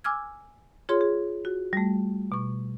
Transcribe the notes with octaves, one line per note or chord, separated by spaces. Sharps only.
G#5 D6 E6 F6 G#6
F4 G#4 C#5 C6
G#4
F#4
G3 A3
B2 C#6